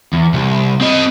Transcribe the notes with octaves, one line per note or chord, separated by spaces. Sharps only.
E2
C2
C4 D#5